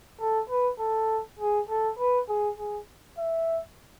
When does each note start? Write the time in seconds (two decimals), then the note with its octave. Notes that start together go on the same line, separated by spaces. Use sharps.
0.19 A4
0.50 B4
0.79 A4
1.39 G#4
1.69 A4
1.99 B4
2.29 G#4
2.58 G#4
3.18 E5